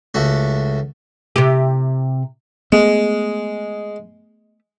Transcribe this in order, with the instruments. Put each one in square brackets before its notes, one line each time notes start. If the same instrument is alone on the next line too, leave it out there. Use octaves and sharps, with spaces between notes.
[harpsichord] C#2 A3 F#4
[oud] C3 G4
[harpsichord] G#3 [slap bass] A3 B3